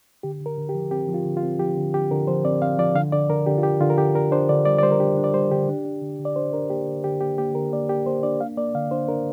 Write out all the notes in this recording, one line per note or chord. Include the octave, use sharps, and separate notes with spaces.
D3 G4
D3
A#4
D3
G4
F3
C4 G4
F3
F4
D3
F4
C4
F3 G4
D3
D3 G4
D3 A#4
F3 C5
C4 D5
C4 F5
F3 D5
D3 F5
D3 D5
D3 A#4
D3 G4
F4
D4 G4
D3 F4
A#4
D3 G4
D4 A#4
D4 C5
D3 D5
G3 D5
D5
G3 C5
A#4
D4 G4
D4
D5
G3 C5
D3 G4
D4
D4
D3
D3
D5
D4 C5
D4 A#4
A#3 G4
D3
D3 G4
A#3 G4
A#3 G4
D3 A#4
A#3 D5
A#3 G4
A#3 C5
D4 D5
A#3 F5
A#3 D5
D3 F5
D4 C5
D4 A#4